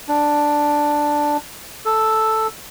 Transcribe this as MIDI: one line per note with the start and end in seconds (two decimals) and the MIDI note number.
0.08 1.37 62
1.85 2.47 69